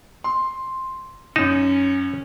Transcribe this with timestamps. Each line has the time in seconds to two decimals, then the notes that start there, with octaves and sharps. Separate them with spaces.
0.24 C6
1.36 F#2 C#4 D#4 E7